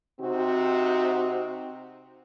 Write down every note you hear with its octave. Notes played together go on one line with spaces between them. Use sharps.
C3 C4 D#4 F#4